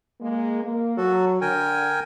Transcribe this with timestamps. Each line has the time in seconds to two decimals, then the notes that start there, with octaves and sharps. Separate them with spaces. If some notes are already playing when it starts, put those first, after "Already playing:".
0.21 G#3 A#3
0.63 A#3
0.97 F#3 F#4 A4
1.41 D3 A#4 G5 G#5